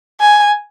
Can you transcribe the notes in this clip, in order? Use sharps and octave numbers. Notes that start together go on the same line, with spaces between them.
G#5